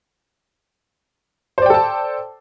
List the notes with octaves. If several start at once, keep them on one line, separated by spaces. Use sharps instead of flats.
A4 C5 D5 G5 A5